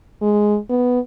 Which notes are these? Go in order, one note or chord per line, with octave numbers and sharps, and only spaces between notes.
G#3
B3